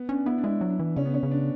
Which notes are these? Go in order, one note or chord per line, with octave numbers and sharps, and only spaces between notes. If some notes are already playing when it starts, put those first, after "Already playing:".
Already playing: B3
C#4 D4
B3 E4
D4
G#3 E4
F#3
D4
E3
C#3 C#4
B3
C#4
C#3
D4